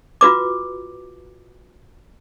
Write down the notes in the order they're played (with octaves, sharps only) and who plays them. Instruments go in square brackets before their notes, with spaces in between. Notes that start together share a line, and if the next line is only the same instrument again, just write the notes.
[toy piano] F4 F#4 B4 D6